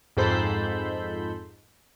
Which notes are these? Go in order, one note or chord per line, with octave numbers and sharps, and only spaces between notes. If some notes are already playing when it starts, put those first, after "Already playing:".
F2 G#2 A4 C5 B5 G6